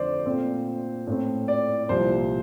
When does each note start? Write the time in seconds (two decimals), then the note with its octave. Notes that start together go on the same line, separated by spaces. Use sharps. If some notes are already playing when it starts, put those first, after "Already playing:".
Already playing: F2 D3 A3 C5 D5
0.26 A#2 A3 C4
1.07 A2 A3 C4
1.48 D5
1.89 C2 A#2 F3 C5